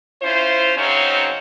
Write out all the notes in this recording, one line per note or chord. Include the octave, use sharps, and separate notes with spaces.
C#4 E4 F4 C5
F#2 C#3 F#3 C4 C#4 D#4